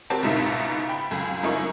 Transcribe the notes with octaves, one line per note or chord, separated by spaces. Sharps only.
C4 F#4 G4 A#4 A5
C#2 G#2 B2 D#4 E5
G5 B5
C#2 F#2
F#2 F3 D#4 E4 A#4 C#6